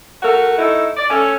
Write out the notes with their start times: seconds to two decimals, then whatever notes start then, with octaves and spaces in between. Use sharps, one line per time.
0.23 A3 F#4 A#4
0.58 A3 D#4 E4
0.96 D5
1.09 A3 C#4